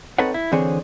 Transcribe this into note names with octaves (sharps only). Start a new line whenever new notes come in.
C4 D#4 A4 B4 C#5 F#5
E4
D3 E3 C4 G#4 C5 C#5